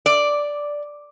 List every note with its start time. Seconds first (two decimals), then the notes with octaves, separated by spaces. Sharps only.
0.06 D5